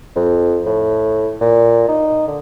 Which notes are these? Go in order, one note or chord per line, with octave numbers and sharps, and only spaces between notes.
F2
A2
A#2
D#4
D3